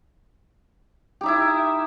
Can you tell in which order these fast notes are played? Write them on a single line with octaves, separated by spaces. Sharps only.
G4 D#4 E5 E4